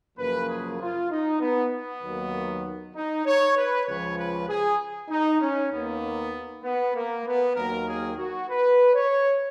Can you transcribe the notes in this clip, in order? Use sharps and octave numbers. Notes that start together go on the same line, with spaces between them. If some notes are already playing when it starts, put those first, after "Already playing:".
F#2 C#3 F3 A#3 B4
G#4
F4
D#4
B3
B3
D#2 D#3 F#3 A#3
D#4
C#5
B4
C#2 C#3 F3 C#5
B4
G#4
D#4
C#4
D#2 D#3 A#3 B3
B3
A#3
B3
D#2 D#3 F#3 A#3 A#4
G#4
F#4
B4
C#5